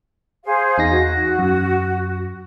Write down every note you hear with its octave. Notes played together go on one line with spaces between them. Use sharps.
G#4 C5 F5
E2 D#4 A#6
F#4
F#2